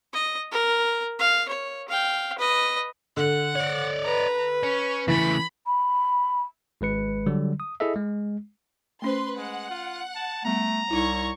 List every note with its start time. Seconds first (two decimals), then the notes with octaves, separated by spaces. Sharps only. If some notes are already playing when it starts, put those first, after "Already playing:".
0.13 D#5
0.52 A#4
1.19 F5
1.49 C#5
1.88 F5 G5
2.38 B4 D#5
3.17 D3 F#5
3.55 C#5 D5
4.05 B4 A#5
4.63 C#4 C#6
5.08 C#3 E3 A3 B5
5.66 B5
6.81 G#1 G#3 B4 C#7
7.26 D3 F#3 G3
7.60 D#6
7.80 E4 G#4 A4 D#5 E5
7.96 G#3
9.02 A3 C#4 B4 C5 C6
9.37 G#3 F#5
9.70 F4
10.16 A5
10.45 G3 A3 B3 A#5
10.91 C2 D#4 E4 C#5 C#6